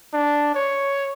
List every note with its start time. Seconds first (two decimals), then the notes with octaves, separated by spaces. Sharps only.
0.14 D4
0.55 C#5